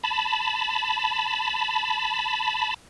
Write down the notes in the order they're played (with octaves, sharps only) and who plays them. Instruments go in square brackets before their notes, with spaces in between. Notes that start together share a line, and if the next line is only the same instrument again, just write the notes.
[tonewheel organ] A5 B5